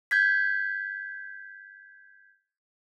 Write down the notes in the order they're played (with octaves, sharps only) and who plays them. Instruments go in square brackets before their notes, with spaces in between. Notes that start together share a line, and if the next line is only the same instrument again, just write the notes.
[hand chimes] G6 G#6 B6